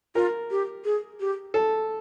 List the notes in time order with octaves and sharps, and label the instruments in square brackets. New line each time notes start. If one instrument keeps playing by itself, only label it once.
[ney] F4 [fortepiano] A#4
[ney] G4
G#4
G4
[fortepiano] A4